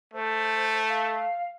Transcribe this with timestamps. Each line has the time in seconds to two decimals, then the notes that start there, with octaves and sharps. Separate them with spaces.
0.14 A3 C5
0.89 F5